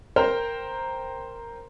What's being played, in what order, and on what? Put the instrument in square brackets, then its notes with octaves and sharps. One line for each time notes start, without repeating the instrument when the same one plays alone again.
[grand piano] A#4 C5 G5 A#5 F6